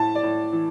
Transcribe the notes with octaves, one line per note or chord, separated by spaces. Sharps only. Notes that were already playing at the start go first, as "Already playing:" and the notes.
Already playing: A2 A5
D5
A2
E3